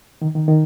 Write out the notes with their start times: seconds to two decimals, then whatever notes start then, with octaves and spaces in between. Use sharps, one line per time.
0.22 D#3
0.35 D#3
0.48 D#3